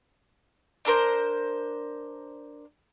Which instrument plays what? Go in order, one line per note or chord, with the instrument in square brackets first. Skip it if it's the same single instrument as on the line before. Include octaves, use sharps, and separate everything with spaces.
[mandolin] D4 A4 A#4 C5